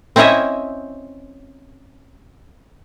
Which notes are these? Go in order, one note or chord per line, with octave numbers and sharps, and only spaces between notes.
C4 C#4 E4 C#5 D#5 E5